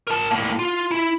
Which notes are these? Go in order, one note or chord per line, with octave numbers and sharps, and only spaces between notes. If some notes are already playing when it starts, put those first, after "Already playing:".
A#4 A5
A2 A#3
F4
E4